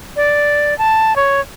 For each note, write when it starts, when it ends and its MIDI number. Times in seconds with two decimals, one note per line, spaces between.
0.16 0.77 74
0.78 1.16 81
1.16 1.41 73